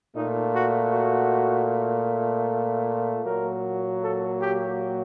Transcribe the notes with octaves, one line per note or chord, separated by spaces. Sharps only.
A#2 A3 D#4
F#4
F#4
A#2 F#3 A#3 A#4
A4
G4